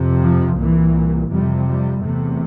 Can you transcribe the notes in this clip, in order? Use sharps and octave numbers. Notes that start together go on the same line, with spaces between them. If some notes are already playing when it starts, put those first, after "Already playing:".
Already playing: F2 C3
F3
C2 A#2 E3
F2 C3 G3
G3
E2 C3 A3